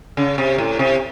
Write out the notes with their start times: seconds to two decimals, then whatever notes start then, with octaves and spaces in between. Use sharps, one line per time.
0.17 C#3
0.38 C3
0.58 A2
0.79 C3